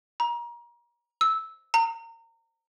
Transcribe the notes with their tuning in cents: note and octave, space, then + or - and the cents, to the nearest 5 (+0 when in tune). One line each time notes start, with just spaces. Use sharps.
A#5 +30
E6 -10
A#5 -30